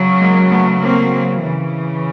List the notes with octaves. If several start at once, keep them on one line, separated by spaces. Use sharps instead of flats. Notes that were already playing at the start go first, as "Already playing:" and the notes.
Already playing: C#3 F#3
G#3 A#3
A3 B3
A#3 C4
C#3 E3